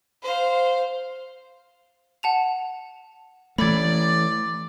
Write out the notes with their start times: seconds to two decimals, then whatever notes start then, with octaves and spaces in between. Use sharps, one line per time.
0.22 C5 F5
2.23 F#5 A5 F7
3.58 E3 A3 D5 B5 G#6